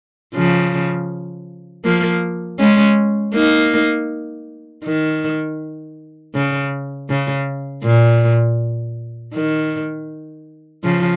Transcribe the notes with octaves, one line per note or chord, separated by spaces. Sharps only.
C#3 F3
F3 A#3
G#3 C#4
A#3 D#4
D#3
C#3
C#3
A#2
D#3
C#3 F3